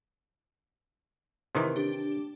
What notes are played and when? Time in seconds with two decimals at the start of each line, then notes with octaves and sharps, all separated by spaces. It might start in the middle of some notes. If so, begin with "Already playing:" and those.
1.55 C3 D#3 E3
1.76 D4 G4